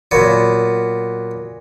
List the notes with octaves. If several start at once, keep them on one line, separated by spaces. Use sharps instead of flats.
A#2 F#3 B3